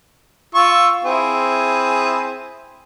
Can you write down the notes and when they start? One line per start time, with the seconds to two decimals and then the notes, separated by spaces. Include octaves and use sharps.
0.55 F4 C#6 E6
1.04 C4 E4 G#4